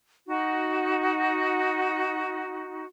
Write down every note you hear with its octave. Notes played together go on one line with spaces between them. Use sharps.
D#4 F#4